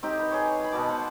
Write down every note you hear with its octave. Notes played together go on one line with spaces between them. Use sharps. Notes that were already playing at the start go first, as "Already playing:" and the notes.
C4 D#4 G4
B4
G#4 C#5
G#5 B5
B2 B3 A5 D6
C5 F#5